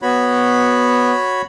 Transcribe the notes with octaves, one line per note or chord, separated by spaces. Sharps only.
B3 F#4 C#5 B5